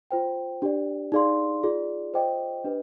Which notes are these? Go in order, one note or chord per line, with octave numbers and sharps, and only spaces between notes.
F4 C5 G5
D4 G4 D5
D#4 G#4 D5 F5 C6
F4 G#4 D5
F4 C5 D#5 G5 D6
D4 G4 B4 D#5